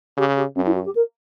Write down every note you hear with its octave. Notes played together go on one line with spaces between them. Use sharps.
C#3 G4
G4
F#2 C#4
E4
F#4
G4
A#4